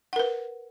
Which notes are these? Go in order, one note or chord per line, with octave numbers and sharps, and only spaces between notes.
A#4 B4 F#5